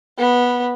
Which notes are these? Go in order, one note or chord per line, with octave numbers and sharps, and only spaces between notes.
B3